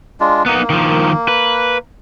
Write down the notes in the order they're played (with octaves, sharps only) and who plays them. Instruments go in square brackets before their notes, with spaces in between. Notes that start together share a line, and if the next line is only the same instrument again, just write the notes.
[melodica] G#3 D4 F4
[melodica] A#3 [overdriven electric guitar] B3 D#4
[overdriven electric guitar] D#3 F3
B4